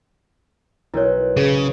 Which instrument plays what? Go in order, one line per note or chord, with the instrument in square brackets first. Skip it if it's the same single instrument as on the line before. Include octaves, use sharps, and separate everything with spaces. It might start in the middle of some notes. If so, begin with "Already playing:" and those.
[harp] B1 F#6 [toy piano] E4 A#4 C#5
[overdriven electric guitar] C#3 [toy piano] G#4